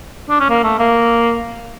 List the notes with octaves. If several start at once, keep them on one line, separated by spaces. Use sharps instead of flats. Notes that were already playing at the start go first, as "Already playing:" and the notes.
D4
C#4
A#3
A3
A#3